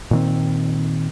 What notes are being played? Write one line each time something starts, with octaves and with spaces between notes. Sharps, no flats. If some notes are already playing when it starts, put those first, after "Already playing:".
A#2 D#3 C4